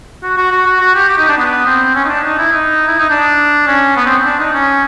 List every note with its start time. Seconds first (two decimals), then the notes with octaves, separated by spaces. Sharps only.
0.23 F#4
0.37 F#4
0.52 F#4
0.66 F#4
0.81 F#4
0.95 G4
1.09 G4
1.18 D#4
1.29 D4
1.38 B3
1.66 C4
1.95 C#4
2.05 D#4
2.09 D4
2.24 D#4
2.38 E4
2.53 D#4
2.88 E4
2.99 D#4
3.10 D4
3.67 C#4
3.97 B3
4.06 C4
4.25 D4
4.39 D#4
4.54 C#4